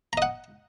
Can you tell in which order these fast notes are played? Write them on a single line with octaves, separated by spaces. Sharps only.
A#5 D#5 F#5